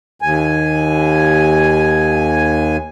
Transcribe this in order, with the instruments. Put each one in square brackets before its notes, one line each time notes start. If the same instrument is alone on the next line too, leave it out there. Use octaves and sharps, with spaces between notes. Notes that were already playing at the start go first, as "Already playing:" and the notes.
[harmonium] D#2 G#5